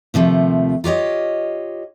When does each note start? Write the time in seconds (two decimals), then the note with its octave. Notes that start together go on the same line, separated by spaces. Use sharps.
0.14 D#2 C3 F3 A3
0.84 F4 G4 C#5 D#5